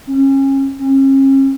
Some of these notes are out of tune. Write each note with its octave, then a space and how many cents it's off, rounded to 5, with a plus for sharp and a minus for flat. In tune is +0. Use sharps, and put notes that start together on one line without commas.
C#4 -30
C#4 -40